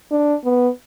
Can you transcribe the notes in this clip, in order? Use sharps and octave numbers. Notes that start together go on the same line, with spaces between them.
D4
B3